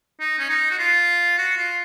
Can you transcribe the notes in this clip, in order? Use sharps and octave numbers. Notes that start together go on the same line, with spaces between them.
D#4
C#4
D#4
F#4
F4
F#4
F4